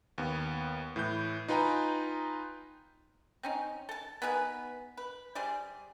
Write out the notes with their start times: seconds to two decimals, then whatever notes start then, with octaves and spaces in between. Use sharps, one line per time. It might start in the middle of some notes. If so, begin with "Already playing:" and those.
0.18 D#2 B3
0.96 A2 E3 G6
1.48 D#4 F4 B4 G5 G#5 A#5
3.43 C4 C#4 D#4
3.89 A4 A5
4.22 B3 D#4 G#4 B4
4.97 B4
5.35 G3 G#4 C5 D5